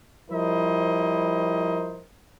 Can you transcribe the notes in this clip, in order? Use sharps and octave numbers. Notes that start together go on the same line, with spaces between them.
F3 G3 E4 A#4 C5 D#5